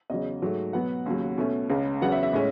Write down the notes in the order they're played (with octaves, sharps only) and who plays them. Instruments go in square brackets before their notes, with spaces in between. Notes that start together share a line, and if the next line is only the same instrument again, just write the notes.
[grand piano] E2 C#3 F#3 D#5
G#2 F#3 A3
B2 F#3 B3 F#5
D#2 C#3 F#3
B2 A3 C#4
C#2 C#3 G#3 C#4
E2 C#3 F#3 B3 F#5
E5
E5
A2 G#3 C#4